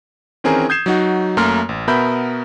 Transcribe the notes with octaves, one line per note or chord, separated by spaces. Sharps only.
D#3 E3 C4 C#4 G#4 A#4
D#6 G6 G#6 C7 E7
F#3 D#4 F#4
F#2 A3 A#3 A#5 C6 F6
A1
B2 B3 A#4 E5 B5 G6